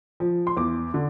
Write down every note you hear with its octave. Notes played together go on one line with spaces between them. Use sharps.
F3
C6
E2 D6
D3